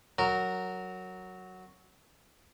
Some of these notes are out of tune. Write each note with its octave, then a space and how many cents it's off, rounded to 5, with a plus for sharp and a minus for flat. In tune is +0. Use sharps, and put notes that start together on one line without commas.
F#3 +0 A#4 -15